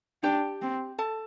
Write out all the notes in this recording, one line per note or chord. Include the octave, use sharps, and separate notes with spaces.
D4 G4 G5
C4
A4 A5